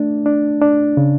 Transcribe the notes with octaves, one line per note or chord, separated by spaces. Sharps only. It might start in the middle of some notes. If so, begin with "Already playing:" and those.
Already playing: A3 D4
D4
D4
C#3